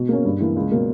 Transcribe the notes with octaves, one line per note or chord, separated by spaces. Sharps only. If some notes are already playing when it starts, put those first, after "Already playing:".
Already playing: B2
A#3 C#4
G2
E3 A#3
C#2
B2 A#3 C#4